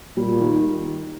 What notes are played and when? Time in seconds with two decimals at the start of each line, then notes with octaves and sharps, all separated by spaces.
0.17 A#2 G3
0.40 D#3